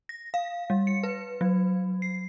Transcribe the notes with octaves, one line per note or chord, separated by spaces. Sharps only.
A#6
F5
G3
C#7
B4
F#3
C7